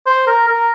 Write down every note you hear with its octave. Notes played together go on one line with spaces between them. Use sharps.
C5
A#4
A#4